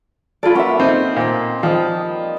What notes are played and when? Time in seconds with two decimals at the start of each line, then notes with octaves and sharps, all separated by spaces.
0.43 F4 G#4 A4 D5 B5
0.55 A#3 C#4 B4 E5 F#5
0.79 C4 D#4
1.16 A#2 C4
1.63 F3 G3 D#5